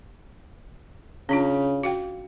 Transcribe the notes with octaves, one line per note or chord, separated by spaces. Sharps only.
C#3 C#4 D4 F4
F#4 F5 G5